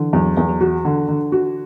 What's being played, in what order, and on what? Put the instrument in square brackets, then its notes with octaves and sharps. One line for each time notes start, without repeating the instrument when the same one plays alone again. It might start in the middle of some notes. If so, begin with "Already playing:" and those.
Already playing: [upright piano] D3 [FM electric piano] E3
[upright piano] E2 [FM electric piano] F#3
[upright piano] E2 [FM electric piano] B3
[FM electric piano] F#3
[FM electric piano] E3 [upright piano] F#4
[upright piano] D3
D3
F#4